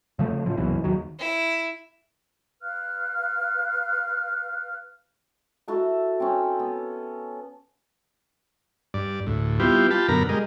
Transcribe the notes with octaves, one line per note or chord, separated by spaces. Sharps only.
C#3 F3 A3
A2 C#3 F3
C2 F#2 B2 E3
D#2 D#3 F#3
E4
B4 F5 F6 F#6
E4 F#4 A4 F#5
C4 C#4
B3
G2 D5
D2 A2
G3 B3 C4 E4 F4 G4
F4 G4 A5 B5
F#2 B2 D3 A#4 A#5 B5
G3 G#3 A#4 D#5